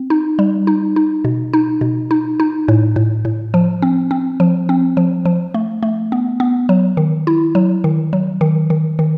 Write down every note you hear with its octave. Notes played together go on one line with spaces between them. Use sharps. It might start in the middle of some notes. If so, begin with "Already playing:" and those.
Already playing: C4
D#4
G3
D#4
D#4
B2
D#4
B2
D#4
D#4
A2
A2
A2
F3
C4
C4
F3
C4
F3
F3
A3
A3
B3
B3
F#3
D#3
E4
F#3
D#3
F#3
D#3
D#3
D#3